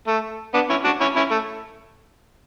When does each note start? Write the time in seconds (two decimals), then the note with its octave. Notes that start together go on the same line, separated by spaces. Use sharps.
0.08 A3
0.54 B3 D4
0.70 C#4 E4
0.85 D4 F#4
1.01 C#4 E4
1.16 C#4 E4
1.31 A3